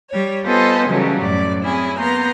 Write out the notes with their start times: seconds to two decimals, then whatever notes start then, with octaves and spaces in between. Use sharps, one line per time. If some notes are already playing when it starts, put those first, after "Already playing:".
0.10 G3 C#5
0.45 B3 F4 A4 C5 D#5 G#5
0.88 C#3 E3 F#3 G3 A3
1.21 F#2 A2 D5
1.62 C4 C#4 E4 G#4
1.99 A#3 B3 A#5 C6 G6